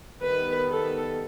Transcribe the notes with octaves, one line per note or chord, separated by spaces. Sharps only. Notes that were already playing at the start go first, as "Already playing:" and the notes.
D#3 G3 B3 B4
A4